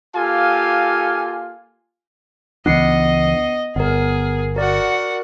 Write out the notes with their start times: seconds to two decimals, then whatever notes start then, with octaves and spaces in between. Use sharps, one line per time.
0.16 A#3 F4 G4 A4 F5 G#5
2.66 C#2 E3 B3 D4 D#5 C7 C#7
3.76 G1 B3 G#4 A#4
4.56 F#4 A#4 D5 F#5